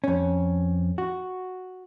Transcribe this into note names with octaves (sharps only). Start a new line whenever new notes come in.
F2 C#4
F#4